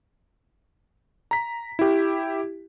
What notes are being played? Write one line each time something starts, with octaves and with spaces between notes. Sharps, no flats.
A#5 B6
E4 G4